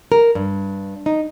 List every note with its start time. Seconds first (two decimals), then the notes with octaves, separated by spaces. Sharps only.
0.12 A#4
0.35 G2
1.06 D#4